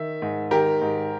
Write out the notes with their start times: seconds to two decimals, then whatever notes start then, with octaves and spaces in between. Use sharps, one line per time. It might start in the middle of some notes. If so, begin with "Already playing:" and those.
Already playing: D#3 E5
0.22 G#2
0.51 D#3 G4 A#4
0.81 G#2